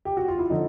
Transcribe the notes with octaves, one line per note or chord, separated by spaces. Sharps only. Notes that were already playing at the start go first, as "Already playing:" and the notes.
G4
F#4
F4
E4
D3 F3 D#4